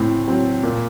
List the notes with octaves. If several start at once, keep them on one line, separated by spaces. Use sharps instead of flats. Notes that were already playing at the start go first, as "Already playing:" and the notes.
Already playing: A2 C4
F#3 C4
A#2